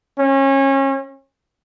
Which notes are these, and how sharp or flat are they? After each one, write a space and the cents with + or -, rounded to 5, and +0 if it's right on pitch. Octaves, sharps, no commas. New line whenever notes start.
C#4 -30